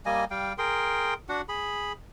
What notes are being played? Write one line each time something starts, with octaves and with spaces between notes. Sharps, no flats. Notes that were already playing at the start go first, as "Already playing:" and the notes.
G3 A#3 D#5 G#5
G3 F5 G5
G#4 A#4 G5 C6
D4 F#4 F#5
G#4 B5